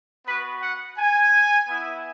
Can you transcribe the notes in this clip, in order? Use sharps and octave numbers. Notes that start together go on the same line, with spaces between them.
B3 F#4 B4
F#5
G#5
B3 E4